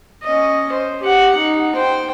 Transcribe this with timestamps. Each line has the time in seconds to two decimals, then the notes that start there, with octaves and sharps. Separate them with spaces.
0.23 C#4 D#5
0.72 C5
1.01 G4 F#5
1.36 D#4
1.75 C5 G5